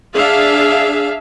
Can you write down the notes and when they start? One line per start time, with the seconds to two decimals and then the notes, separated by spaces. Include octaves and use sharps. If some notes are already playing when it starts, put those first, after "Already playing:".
0.15 D4 G#4 E5 F5